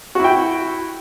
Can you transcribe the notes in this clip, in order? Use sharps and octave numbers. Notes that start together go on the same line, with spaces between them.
E4 F#4 G5